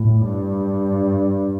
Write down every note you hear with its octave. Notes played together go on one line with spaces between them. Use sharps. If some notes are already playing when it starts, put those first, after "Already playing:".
Already playing: A2
G2